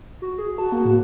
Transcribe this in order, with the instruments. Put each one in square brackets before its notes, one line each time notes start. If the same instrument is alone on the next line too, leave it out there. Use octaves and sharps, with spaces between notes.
[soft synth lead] F#4
G#4
[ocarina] F#4 [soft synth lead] A5
[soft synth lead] A#3
A2